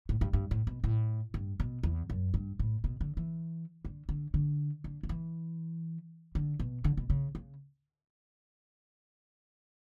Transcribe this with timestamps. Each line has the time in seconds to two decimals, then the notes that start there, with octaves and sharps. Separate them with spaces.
0.09 A2
0.21 G2
0.33 G2
0.51 A2
0.67 B2
0.84 A2
1.34 G2
1.60 B2
1.83 E2
2.10 F#2
2.34 G2
2.59 A2
2.84 B2
3.01 D3
3.17 E3
3.85 D3
4.09 D3
4.34 D3
4.84 D3
5.03 D3
5.09 E3
6.35 D3
6.60 B2
6.84 D3
6.97 B2
7.10 C#3
7.35 C#3